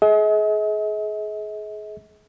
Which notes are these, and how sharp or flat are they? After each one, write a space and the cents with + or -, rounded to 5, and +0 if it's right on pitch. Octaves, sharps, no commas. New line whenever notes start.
G#4 +30 D#5 +45